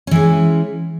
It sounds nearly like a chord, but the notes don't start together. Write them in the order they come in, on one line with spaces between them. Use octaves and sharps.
C#4 E3 G#3